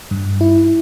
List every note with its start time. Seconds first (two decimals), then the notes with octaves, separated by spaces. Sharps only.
0.11 G2
0.41 E4